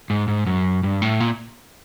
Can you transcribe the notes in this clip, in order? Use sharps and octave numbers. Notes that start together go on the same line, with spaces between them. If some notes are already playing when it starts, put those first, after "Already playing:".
G#2
G#2
F#2
G2
A2
A#2